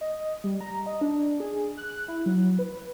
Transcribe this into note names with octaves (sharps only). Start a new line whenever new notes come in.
D#5
G3
A#5
D#5
D4
G#4
F#6
E4
F#3
B4